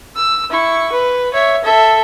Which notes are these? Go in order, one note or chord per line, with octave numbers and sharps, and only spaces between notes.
E6
E4 C#6
B4
C#5 E5
A4 E5